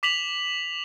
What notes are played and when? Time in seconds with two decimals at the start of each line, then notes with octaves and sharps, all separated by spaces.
0.03 D6 B6 F7 F#7